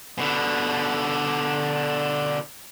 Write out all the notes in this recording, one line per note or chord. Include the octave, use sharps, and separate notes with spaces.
B2 D3